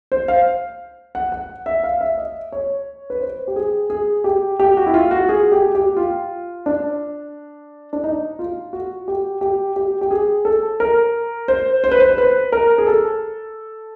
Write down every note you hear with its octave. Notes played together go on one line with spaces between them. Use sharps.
C5
F5
F#5
F#5
E5
F5
E5
D#5
C#5
B4
C5
G4
G#4
G#4
G4
G4
F#4
E4
F4
F#4
G#4
G4
G4
F4
D4
D4
D#4
F4
F#4
G4
G4
G4
G4
G#4
A4
A#4
C5
C5
B4
C5
C5
B4
A#4
G#4
A4